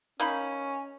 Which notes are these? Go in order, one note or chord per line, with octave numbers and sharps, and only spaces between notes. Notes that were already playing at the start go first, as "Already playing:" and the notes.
A#3 C#4 D#4 B5